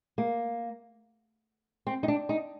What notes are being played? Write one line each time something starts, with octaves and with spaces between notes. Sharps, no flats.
A#3
C4
D#4
D4
D#4